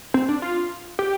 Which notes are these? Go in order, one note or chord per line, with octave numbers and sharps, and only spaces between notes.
C4
D4
F4
G4